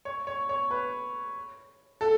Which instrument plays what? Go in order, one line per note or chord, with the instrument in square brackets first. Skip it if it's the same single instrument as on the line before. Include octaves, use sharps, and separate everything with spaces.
[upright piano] C#5
C#5
C#5
B4
A4